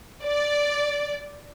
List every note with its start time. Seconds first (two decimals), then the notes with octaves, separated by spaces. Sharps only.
0.23 D5